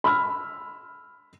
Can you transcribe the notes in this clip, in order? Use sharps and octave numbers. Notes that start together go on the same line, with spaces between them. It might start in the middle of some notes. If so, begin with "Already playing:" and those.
B5 E6 F6